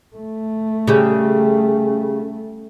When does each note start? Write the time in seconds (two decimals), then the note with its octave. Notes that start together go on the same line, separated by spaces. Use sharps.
0.16 A3
0.87 C#3 G3